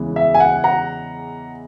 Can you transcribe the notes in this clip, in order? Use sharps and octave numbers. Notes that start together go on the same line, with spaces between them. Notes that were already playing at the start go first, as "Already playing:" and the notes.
Already playing: E2 C#3 E3 G#3
E5
G#5
F#5
F#5 A#5